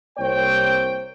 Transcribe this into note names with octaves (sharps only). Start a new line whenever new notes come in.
C2 A#3 C5 C#5 G5